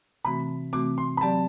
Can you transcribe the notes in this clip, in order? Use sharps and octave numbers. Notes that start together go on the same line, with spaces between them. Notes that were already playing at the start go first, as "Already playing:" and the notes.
C3 E3 A3 C4 F#4 B5
C3 E3 A3 C4 F#4 D6
C6
B5
F#3 C4 G4 D5 A5